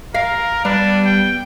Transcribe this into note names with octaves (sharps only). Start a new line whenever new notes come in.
A#4 F5
G3 B3 D4
G5